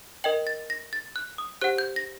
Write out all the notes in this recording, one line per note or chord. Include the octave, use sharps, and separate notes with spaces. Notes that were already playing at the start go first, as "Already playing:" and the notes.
A#4 D#5 G5 F#7
A6
A#6
A6
F#6
D#6
G4 C5 F#5 F#6
G6
A#6